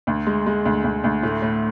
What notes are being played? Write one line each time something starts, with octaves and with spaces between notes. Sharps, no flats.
D2
G#3
G#3
D2
D2
D2
A2
A2